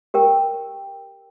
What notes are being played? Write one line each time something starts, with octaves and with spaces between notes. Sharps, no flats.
G4 A#4 G5